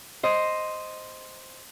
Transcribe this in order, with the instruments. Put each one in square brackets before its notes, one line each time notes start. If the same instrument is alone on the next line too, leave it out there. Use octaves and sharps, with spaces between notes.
[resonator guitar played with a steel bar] C5 D#5